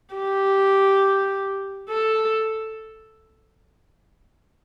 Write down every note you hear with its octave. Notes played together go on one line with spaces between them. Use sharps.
G4
A4